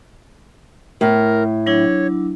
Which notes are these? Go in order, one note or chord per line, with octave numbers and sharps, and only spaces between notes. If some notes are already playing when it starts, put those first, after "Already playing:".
A2 A#4
F#3 D4 E4 C#5